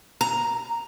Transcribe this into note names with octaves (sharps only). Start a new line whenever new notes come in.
A#5